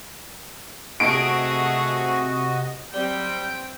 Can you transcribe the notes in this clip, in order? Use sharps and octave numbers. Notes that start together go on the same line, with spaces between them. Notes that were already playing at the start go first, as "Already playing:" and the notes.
C3 A3 F#4 G#4 D#5 D7
F#3 G3 C4 G5